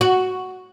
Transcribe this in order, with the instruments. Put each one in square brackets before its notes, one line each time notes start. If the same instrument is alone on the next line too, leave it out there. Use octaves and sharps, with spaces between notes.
[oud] F#4